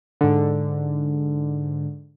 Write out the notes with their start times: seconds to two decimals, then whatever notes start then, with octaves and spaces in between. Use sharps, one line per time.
0.21 G#2 D3